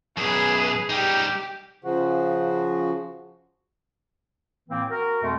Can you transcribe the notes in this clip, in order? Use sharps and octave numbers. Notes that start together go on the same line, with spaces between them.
F#2 B2 G#4 B4
G3 D#4 G4
C#3 F3 F#4
A2 E3 A#3 C4
F#4 A#4
F2 B2 G#3 A3